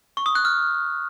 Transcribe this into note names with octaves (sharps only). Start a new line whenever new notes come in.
C#6
D#6
F#6
F6